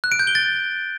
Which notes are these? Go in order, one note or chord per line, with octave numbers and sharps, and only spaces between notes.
F#6
D7
G6
G7
A6